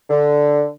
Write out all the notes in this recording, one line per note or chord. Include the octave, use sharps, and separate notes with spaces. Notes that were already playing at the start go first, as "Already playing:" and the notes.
D3